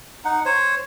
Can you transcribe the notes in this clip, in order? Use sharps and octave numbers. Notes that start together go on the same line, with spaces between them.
D#4 F#5
C5 C#5